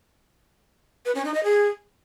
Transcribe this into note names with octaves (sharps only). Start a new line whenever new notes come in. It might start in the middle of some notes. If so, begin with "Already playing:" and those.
B4
C#4
D#4
D#5
G#4